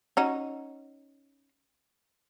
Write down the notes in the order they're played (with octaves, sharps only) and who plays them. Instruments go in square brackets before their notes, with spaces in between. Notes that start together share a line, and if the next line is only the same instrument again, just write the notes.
[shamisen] C#4 D#4 F#4